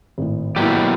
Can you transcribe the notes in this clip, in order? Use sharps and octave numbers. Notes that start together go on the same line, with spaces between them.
G#1 A2
B2 F#3 A#3 E4 G4